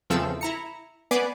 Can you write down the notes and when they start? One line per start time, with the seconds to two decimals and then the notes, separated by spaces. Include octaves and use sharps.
0.10 E2 C#3 F3 C4 A4 E6
0.41 E4 A#5 C#7
1.11 B3 B4 D5 G#5 D6 C7